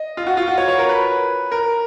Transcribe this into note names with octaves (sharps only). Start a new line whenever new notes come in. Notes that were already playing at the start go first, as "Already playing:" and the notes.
Already playing: D#5
F4
F#4
F4
F#4
C#5
C#5
A#4
B4
A#4